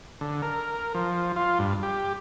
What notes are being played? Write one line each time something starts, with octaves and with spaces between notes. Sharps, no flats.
D3
A#4
F3
F4
G2
G4